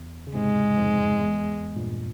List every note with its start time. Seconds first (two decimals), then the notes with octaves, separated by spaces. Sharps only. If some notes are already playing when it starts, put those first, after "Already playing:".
Already playing: E2
0.27 C#3
0.34 G#2 C3 G#3
0.77 F2 G#2
1.19 E2
1.76 G2 A#2